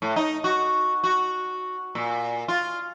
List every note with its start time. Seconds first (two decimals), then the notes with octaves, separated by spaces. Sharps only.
0.02 A2
0.16 D#4
0.44 F#4
1.04 F#4
1.95 A#2
2.48 F4